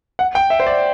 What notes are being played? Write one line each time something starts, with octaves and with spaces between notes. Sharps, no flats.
F#5
G5
E5
C5
D5